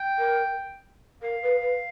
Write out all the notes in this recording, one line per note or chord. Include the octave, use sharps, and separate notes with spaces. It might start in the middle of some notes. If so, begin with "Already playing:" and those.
Already playing: G5
A#4
A#4 F5
B4
B4